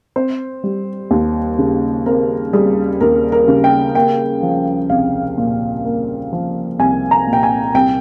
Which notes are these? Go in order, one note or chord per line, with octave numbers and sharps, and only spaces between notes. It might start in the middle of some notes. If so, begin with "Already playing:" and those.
C4 C5
G3
D#2
C#3
C4 A#4
G3 G#4
D#2 A#4
A#4
C#3
G5
A#3 G5
F3
C2 F5
A#2
A#3
F3
C2 G#5
A#5
A#2
G5
G#5
C2 G5